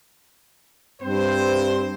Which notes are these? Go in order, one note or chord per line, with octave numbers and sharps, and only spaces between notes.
G2 C4 C5